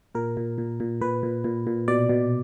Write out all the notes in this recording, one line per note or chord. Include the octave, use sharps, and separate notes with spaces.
A#2 A#4
A#2
A#2
A#2
A#2 B4
A#2
A#2
A#2
B2 D5
B2